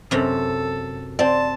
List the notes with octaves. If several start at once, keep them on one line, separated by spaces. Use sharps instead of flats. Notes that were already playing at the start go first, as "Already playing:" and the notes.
F#2 C3 A4
C4 D5 A5